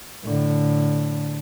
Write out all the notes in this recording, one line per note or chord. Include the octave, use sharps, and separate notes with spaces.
A2 D3